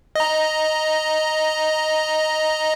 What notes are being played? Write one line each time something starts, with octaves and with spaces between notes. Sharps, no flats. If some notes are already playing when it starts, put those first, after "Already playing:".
D#5 A#5